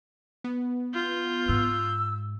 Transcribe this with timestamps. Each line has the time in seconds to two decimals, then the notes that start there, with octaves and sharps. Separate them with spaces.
0.44 B3
0.94 F4 G6
1.49 G#2 E6